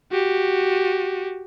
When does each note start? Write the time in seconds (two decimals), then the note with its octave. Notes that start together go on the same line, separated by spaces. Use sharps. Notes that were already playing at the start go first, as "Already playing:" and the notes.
0.12 F#4 G4